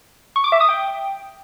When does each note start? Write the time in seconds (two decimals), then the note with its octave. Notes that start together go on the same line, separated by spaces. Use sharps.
0.36 C#6
0.44 D6
0.52 E5
0.60 D#6
0.69 G5